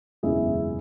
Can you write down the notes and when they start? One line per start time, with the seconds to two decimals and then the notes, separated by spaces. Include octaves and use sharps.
0.23 F#1 E2 B2 G#3 C#4 E4 G#4